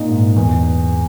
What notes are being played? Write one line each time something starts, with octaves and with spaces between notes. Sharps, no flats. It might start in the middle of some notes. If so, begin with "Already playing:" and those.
Already playing: A#2 D#4
G#2
E2